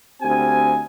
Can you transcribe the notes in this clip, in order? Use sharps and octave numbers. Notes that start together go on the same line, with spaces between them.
D2 C4 G4 G#5